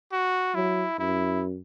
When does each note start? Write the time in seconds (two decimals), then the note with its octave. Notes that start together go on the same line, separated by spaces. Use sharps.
0.12 F#4
0.55 F#3 E4
0.99 F#2 E4